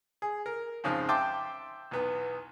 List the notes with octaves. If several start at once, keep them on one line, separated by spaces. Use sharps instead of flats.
G#4
A#4
F2 G#2 C#3 F3
E5 G5 A5 C6 D6
B1 E2 B3